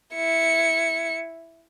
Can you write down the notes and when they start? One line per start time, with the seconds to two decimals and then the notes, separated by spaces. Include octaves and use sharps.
0.15 E4 C#7